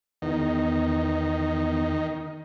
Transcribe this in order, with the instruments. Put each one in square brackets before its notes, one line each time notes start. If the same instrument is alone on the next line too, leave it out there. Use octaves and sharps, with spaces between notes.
[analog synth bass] E2 [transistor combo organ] D#3